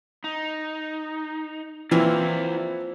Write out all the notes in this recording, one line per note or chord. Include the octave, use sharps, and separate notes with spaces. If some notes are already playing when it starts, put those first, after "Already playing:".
D#4
E3 F3 A#3 C4 E4 D5 E5